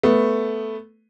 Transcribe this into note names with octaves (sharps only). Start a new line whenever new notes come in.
A3 B3